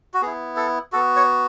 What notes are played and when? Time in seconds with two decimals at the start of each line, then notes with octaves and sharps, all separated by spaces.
0.14 F#4
0.22 B3 E4 G#4
0.57 A4
0.92 B3 F#4 A4
1.16 C#5